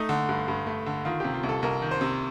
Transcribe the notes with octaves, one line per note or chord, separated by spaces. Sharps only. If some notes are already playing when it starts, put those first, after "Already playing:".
Already playing: A3 D#4
D3
G2
G2
A3
D3
D#3 F4
C3 G4
F4
C2
A4
C2 A#4
D#3
C5
C3